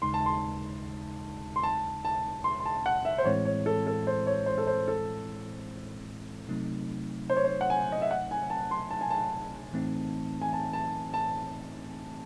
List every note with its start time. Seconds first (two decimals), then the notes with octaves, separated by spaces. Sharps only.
0.02 D#2 C#3 G#3 D#4 C6
0.14 A5
0.26 C6
1.56 C6
1.63 A5
2.05 A5
2.44 C6
2.60 C6
2.66 A5
2.86 F#5
3.05 E5
3.18 C5
3.25 A2 E3 G#3 C4 E4 C#5
3.45 C#5
3.66 A4
3.87 A4
4.07 C5
4.27 C#5
4.46 C5
4.58 A4
4.67 C5
4.88 A4
6.48 C3 F#3 A3 C4 D#4
7.30 C5
7.36 C#5
7.45 C5
7.61 F#5
7.70 G#5
7.92 D#5
8.02 E5
8.11 F#5
8.31 G#5
8.50 A5
8.71 C6
8.91 A5
9.01 G#5
9.10 A5
9.72 A2 E3 A3 C4 D#4
10.42 G#5
10.53 A5
10.73 A5
11.14 A5